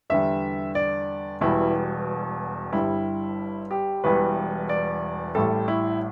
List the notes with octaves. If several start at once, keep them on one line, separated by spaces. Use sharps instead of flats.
E2 D3 G3 E5
D5
E1 E2 B2 G3 E4
G1 G2 G3 E4
G4
E1 E2 E3 G3 B4
D5
A1 A2 G3 A4
E4